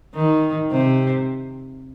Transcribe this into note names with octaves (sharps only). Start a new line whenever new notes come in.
D#3
C3